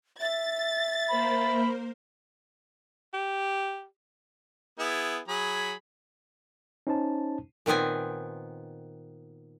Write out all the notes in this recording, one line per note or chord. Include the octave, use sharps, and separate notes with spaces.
E5 A6
A#3 A#4 C5 B5
G4
B3 E4 G#4
F#3 G#4 B5
C#4 D#4 C5 A5
A#2 D#3 B3 C4 G#5